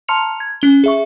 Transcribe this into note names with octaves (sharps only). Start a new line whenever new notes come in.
A5 A#5 C6 F6 C#7 F7
G#6
C#4 G7
G#4 E5 C#6